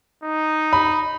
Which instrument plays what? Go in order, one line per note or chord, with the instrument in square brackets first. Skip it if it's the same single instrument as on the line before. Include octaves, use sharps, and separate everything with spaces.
[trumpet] D#4
[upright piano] B5